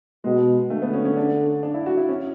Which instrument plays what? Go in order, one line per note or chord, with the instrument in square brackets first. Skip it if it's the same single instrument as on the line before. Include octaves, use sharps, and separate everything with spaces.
[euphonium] B2 [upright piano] G#3
[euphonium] D3 [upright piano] A3
[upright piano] B3
C#4
C#4
D4
D4
E4
F#4
E4
C#4